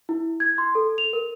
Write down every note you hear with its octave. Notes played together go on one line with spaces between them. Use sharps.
E4
G#6
C6
A4
F7
A#4